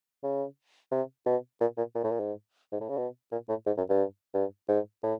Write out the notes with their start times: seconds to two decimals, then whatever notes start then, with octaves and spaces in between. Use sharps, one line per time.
0.23 C#3
0.91 C3
1.26 B2
1.61 A#2
1.77 A#2
1.95 A#2
2.04 A2
2.11 A#2
2.20 G#2
2.72 G#2
2.81 A2
2.89 C#3
2.97 B2
3.32 A#2
3.49 A2
3.66 G#2
3.77 F#2
3.89 G2
4.34 G2
4.68 G#2
5.03 A2